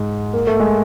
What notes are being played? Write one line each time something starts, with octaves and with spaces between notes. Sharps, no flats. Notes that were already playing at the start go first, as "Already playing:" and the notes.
Already playing: G#2 G#3
A#3
A3
G#3